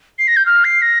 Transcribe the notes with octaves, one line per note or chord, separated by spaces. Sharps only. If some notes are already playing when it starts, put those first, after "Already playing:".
C7
A#6
G6
F6
C7
A#6